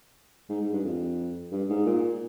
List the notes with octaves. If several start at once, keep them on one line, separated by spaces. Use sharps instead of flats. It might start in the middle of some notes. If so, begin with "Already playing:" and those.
G#2
G#2
G2
F2
G2
G#2
A#2